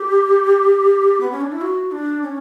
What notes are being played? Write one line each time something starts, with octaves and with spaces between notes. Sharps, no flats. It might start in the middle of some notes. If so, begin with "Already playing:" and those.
Already playing: G4
B3
C#4
D4
E4
F#4
D4
C#4